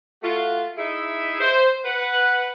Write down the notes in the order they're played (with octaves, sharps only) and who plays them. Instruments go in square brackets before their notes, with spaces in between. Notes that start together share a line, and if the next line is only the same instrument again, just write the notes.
[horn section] A3 F4 F#4
D#4 E4 G#4 E5
C5
B4 F#5